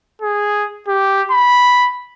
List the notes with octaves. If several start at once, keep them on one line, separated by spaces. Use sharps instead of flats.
G#4
G4
B5